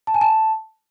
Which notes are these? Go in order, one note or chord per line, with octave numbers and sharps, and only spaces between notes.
A5
G#5
A5